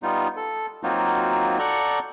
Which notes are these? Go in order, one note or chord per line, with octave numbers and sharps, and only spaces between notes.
G3 B3 D#4 F4
A4
F#3 A#3 C4 D#4 F4 F#4
A4 D5 F#5 A#5 C#6 G6